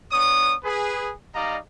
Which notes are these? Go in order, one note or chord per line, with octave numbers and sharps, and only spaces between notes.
B3 D4 C#5 D#6
G#4 B4
G3 D#4 D5 D#5 F5 A#5